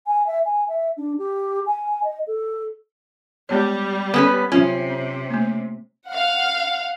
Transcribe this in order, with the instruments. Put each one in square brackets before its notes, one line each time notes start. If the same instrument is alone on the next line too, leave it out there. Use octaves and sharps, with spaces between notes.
[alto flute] G#5
E5
G#5
E5
D4
G4
G#5
D#5
A4
[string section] G3 [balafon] G#3 B3 C#5
[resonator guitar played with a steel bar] B3 C#4 B4 [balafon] F#5
[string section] C3 [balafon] F#3 F4 [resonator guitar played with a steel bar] C#4
[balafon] C4
A3 A#3
[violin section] F5 F#5